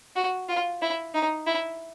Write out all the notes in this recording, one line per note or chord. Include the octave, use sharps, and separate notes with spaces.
F#4
F4
E4
D#4
E4